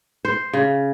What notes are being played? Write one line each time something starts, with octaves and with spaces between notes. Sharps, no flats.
C5
C#3